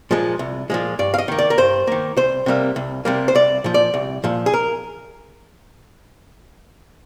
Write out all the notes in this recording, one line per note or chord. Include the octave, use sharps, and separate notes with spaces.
A#2 F3 G#3
C2
A#2 F3 G#3
G2 D5
F5
D#5
D#3 A#3
D5
A#4
G2 C5
D#3 A#3
C2 C5
C3 G3 A#3
C2
C3 G3 A#3
C5
C2 D5
A#2 F3
D5
C2
A#2 F3
G#4
A#4